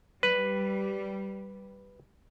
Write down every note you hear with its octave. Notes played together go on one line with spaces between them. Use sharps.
G3 B4